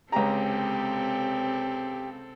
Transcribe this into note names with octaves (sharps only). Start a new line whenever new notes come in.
C#2 C3 C4 G4 A4 A#5